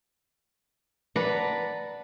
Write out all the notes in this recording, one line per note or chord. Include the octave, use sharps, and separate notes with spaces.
B4 D5 F#5 A5 A#5